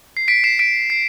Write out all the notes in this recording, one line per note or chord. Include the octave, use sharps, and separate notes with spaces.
C7
B6 D7
C7 E7
B6 D7
C7